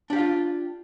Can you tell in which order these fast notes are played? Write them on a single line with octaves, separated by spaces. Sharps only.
D4 G4 F5 F4